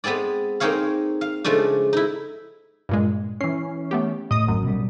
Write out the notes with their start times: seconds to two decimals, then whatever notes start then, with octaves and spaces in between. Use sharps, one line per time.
0.04 G#3 B3 C4 G#4 D5
0.60 A#3 C4 D#4 G#4 C#5 F5
1.21 F5
1.44 C#3 F3 G#3 A3 D4
1.93 D#4 E4
2.89 G2 A#2 G#3
3.41 E3 C#4 C7
3.91 A3 B3 G4
4.31 A2 D#5 D#6
4.47 G#1 F#2
4.63 B2 G3